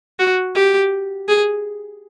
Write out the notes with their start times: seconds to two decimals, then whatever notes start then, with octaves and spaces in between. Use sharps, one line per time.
0.19 F#4
0.55 G4
1.28 G#4